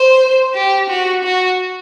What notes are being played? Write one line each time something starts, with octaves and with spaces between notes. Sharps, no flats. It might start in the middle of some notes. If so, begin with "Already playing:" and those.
Already playing: C5
G4
F#4
F#4